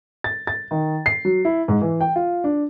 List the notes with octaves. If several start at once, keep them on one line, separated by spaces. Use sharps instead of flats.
A6
A6
D#3
C7
F#3
E4
G#2
E3
G5
F4
D4